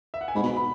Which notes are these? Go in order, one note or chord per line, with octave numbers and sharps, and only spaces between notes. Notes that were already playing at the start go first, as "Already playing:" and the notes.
E5
F#5
G#5
G#2 B5
B2
B5
B5